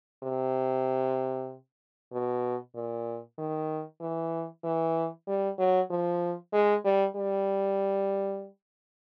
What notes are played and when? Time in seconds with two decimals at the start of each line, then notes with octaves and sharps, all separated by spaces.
0.24 C3
2.12 B2
2.75 A#2
3.38 D#3
4.01 E3
4.64 E3
5.28 G3
5.59 F#3
5.91 F3
6.53 G#3
6.85 G3
7.16 G3